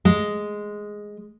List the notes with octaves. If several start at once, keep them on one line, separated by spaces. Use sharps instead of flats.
G#3